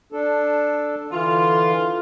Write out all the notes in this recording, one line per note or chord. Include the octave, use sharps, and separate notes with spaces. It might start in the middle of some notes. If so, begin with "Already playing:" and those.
D4 A4
D3 E3 F4